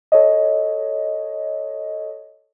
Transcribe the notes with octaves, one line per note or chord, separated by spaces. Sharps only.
A4 C#5 D#5